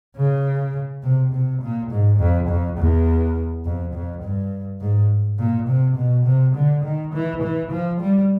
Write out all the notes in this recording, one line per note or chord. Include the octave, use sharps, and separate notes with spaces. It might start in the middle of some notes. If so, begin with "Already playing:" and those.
C#3
C3
C3
A#2
G#2
F2
F2
E2
F2
F2
G2
G#2
A#2
C3
B2
C3
D3
D#3
E3
E3
F3
G3